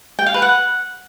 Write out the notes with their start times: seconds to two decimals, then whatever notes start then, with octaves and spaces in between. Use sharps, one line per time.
0.19 G5
0.26 F5
0.34 B4
0.42 F#5